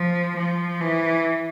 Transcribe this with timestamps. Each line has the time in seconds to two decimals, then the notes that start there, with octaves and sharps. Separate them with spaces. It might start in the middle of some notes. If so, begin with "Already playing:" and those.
Already playing: F3
0.36 F3
0.81 E3